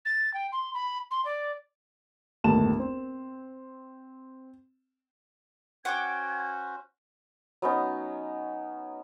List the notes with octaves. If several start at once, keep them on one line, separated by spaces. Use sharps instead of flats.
A6
G5
C6
B5
C6
D5
G1 D#2 A2 A5 E7
C4
C#4 F#4 C5 F#5 G5 D6 G#6
F#3 B3 C#4 D#4